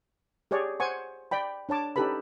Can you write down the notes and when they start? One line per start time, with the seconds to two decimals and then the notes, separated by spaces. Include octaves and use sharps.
0.51 G4 G#4 C#5 D5
0.80 C5 F#5 G#5 C#6
1.31 D5 G5 B5
1.69 D4 C#5 A5 D6
1.96 C#4 D#4 G4 A4 B4 B5